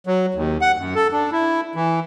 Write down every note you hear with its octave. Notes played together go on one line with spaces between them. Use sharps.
F#3
D#2
F#5
F#2
A4
D4
E4
E3